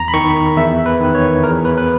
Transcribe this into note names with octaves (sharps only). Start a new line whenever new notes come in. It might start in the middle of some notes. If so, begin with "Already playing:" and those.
Already playing: E2 A#5
B5
D#3 C#6
E2 E5
B4
D#3
C#5
E2 A#4
B4
B4